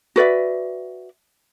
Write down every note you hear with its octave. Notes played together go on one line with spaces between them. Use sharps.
F#4 B4 D5 E5